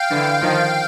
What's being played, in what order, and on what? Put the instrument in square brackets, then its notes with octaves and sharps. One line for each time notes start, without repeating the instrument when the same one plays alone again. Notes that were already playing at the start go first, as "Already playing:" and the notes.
Already playing: [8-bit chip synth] F5 G5
[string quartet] D3 E3
D#3 F3